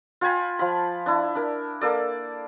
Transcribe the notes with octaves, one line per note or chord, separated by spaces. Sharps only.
F4 G5 G#5 B5
F3 F5 B5
D4 E4
D4 A#4
A#3 A4 D5